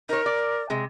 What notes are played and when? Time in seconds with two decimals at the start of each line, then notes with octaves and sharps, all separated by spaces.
0.09 D#4 A#4 C#5
0.26 D5
0.70 C3 G#3